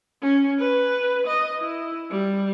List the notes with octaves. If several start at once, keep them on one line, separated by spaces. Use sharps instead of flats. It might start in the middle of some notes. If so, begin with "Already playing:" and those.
C#4
B4
D#5
E4
G3